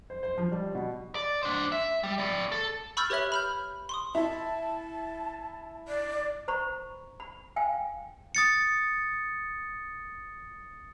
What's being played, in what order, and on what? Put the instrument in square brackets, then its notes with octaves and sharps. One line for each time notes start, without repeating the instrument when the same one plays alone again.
[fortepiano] C5
C5
F3
G3
B2
[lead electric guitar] D5
D4 C5
E5
G3
A2 D5
A4
[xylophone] B5 C#6 E6 F6 G6 A6
G4 B4 C#5 E5 F#7
B5 F6 G6
C6 C#6 D#6
[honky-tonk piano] E4 [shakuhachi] A5
[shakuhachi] D5
[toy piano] C5 A#5 B5 C#6
B5
F5 G5 G#5
[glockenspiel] D#6 A6 C#7